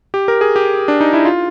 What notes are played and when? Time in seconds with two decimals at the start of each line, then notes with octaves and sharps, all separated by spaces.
0.14 G4
0.28 A#4
0.41 G#4
0.56 G4
0.88 D4
1.01 D#4
1.13 E4
1.25 F4